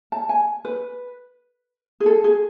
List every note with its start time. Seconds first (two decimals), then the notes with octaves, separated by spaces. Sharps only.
0.12 A5
0.29 G#5
0.65 B4
2.00 G#4
2.06 A4
2.24 G#4